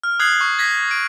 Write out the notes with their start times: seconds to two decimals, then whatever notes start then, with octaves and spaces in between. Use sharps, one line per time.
0.04 F6
0.19 D#6 F#6 G#6 C7 F#7
0.41 C#6
0.59 G#6 A#6 B6
0.91 D7